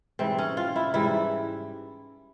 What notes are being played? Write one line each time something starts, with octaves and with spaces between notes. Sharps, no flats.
G#2 E3 G3 C4
C#4
F4
E4
G#2 E3 G3 E4